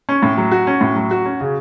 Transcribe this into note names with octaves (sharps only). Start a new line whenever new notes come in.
C#4
A2
F#3
F#4
C#4
A2
F#3
F#4
C#4
C#3